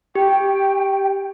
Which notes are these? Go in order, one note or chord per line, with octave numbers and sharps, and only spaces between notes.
G4 G5